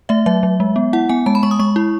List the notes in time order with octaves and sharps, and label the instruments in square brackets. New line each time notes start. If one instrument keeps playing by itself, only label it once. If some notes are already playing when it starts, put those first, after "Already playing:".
[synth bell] A3 E5
F#3 E5
F#3
G#3
B3
E4 F#5
B3 G#5
G#3 A5
B5
G#3 C#6
D#6
G#3 C#6
E4